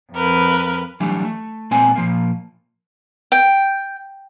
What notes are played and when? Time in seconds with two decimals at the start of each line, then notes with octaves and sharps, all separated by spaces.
0.13 F2 A#4 B4
1.00 E3 F#3 G3 A3 D4
1.25 A3
1.71 A#2 G#3 B3 C4 D5 G#5
1.96 A#2 F3 A#3
3.32 G5